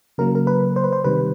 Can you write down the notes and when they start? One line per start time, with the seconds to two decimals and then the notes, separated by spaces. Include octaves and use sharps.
0.18 C#3 F#3 A#3 A#4
0.35 A#4
0.47 B4
0.76 C5
0.84 B4
0.93 C5
1.04 C3 D#3 G3 B4